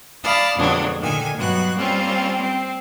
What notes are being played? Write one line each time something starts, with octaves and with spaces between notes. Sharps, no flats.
D5 F5 A5 B5 D#6 F6
F2 B2 D3 F#3 G#3 D4
A#2 D3 D#3 G#5
G2 B2 F#3 F#4 F#6
G3 A#3 C4 C#4 F4
C4